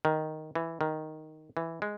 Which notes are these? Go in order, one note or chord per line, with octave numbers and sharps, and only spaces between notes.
D#3
E3
D#3
E3
G#3